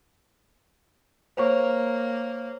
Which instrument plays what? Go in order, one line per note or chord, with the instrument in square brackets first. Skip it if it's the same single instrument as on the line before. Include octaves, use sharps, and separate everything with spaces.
[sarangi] A#3 [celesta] C5 C#5 C#6